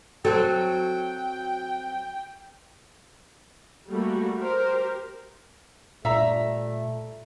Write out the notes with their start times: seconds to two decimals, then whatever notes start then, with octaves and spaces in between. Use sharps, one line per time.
0.25 F#3 C4 A4 G5
3.89 G3 A3 A#3 F#4
4.39 G4 A#4 C5
6.05 A#2 G3 A3 E5 A#5